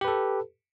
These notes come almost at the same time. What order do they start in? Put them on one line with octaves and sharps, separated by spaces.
G4 B4 A4